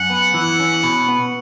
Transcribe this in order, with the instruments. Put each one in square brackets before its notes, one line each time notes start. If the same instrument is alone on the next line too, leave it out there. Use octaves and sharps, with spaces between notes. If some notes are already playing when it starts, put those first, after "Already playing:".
Already playing: [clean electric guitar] F#2 [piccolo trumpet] F#5
[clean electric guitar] B3
E3
C#4
B2
B3